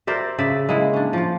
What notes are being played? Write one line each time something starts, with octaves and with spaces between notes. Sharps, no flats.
A#4 C5 D5 E5
C#3 D5 E5
G#3 A#3 E4
C#4 D4
F3 F4